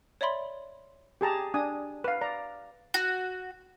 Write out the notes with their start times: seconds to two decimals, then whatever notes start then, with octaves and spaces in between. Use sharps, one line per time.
0.21 C#5 D5 E5 B5 C6
1.21 G4 G#4 A5 A#5
1.54 D4 G#5 D#6
2.04 B4 F5
2.21 D5 A#5
2.94 F#4